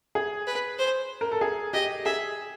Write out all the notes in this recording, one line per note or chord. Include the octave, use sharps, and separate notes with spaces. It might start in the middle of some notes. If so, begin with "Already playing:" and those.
G#4
B4
C5
A#4
A4
G#4
G4 D#5
G#4 E5